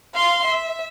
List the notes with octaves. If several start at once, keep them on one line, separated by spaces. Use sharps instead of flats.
F5 C6
E5